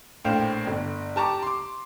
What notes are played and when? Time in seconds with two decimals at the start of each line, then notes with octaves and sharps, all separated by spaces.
0.24 A#1 A2 C5 F5 G5
0.67 G1
1.16 G4 A5 A#5 C#6 D6
1.43 C6 D6